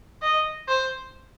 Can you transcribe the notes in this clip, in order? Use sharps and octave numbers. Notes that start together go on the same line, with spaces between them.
D#5
C5